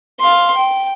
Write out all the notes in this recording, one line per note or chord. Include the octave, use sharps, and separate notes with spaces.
F5 C6
G5